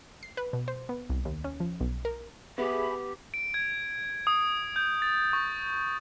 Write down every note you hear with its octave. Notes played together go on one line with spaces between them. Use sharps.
C7
B4
B2
C5
B3
C2
D#2
C#4
F3
B1
A#4
B3 G4 G#4 E5 B5
D7
G#6
D#6
G6
A6
C#6